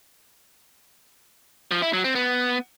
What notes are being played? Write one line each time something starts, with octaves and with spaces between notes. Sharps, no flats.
F3
E4
F#3
C4
B3